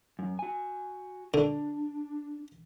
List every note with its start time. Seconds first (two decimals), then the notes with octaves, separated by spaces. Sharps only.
0.19 F#2
0.39 F#4 G#5
1.34 D3 D4